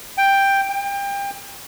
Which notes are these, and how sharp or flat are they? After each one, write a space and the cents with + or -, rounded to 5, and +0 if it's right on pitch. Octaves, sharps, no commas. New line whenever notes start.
G5 +5
G5 +30